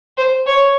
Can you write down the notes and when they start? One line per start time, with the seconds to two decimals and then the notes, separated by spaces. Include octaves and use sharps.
0.17 C5
0.46 C#5